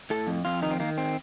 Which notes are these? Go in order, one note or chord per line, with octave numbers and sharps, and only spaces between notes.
A2 A4
F2
F2 F4
D#3 D#4
C4
D#3 A#3
C4